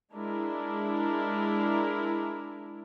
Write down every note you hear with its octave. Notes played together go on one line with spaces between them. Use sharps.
G#3 D4 E4 A#4